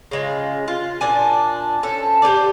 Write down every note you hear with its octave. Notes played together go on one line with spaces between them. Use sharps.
C#3 G#3 F4
F4
A#2 D4 G#5
C#4 A4 C5
G4 G#4 C5 D5